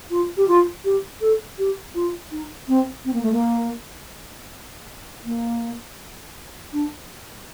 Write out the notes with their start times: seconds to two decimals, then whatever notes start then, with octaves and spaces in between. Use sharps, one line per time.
0.11 F4
0.37 G4
0.48 F4
0.85 G4
1.21 A4
1.58 G4
1.95 F4
2.31 D#4
2.68 C4
3.05 C4
3.13 A#3
3.23 A3
3.32 A#3
5.26 A#3
6.73 D4